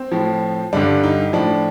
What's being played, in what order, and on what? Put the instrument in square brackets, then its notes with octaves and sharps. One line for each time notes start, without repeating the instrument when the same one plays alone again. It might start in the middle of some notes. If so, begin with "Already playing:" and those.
Already playing: [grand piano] C4
A2 F3
G2 D3 G3 D4
D#4
A2 F3 D4